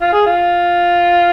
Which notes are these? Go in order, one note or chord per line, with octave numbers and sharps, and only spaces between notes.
F4
G#4
F4